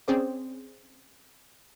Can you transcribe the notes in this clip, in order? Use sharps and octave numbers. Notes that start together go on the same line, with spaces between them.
C4 C#4 G#4 C5 D5